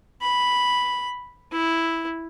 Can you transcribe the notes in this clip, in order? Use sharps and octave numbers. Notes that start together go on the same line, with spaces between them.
B5
E4